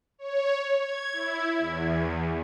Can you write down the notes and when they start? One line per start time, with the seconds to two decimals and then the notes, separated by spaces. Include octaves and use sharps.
0.18 C#5
0.78 G#6
1.13 E4
1.59 E2